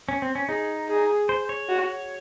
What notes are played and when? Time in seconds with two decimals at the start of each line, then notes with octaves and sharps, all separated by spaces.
0.09 C#4
0.22 C4
0.35 C#4
0.48 D#4 G#4
0.89 G#4
1.29 C5
1.49 C#5
1.69 F#4